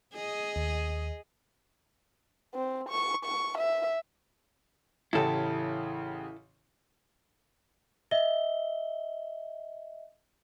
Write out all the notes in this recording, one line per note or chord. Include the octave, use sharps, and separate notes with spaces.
G#4 D#5
D#2
C4
C#6
C#6
E5
A1 C#3 E4 G4 A4
D#5 E5 G7